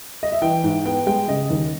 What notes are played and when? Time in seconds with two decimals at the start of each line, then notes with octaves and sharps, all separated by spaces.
0.23 D#5
0.32 E5
0.42 E3 G5
0.64 G#2
0.85 B3 G5
1.07 G#3 G5
1.28 C#3 D#5
1.50 D#2